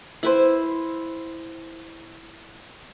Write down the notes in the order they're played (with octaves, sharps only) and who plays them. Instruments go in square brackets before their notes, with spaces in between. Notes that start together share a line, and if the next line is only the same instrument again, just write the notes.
[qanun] E4 B4 C5